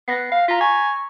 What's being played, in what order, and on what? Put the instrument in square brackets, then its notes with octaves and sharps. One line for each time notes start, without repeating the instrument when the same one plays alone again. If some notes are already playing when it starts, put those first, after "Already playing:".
[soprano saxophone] B3 [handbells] F#6 A#6 C7
[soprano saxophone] F5
[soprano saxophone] F4 [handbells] A#5 A#6 B6
[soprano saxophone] G#5 [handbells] C#6